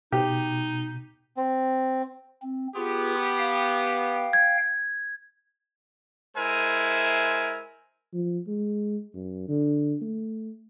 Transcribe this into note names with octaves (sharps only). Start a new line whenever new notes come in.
B2 D#4 G4
C4
C4
B3 F4 G4 G#4
F5 G5
G#6
G#3 E4 A#4 C5 E5 G#5
F3
G#3
F#2
D3
A3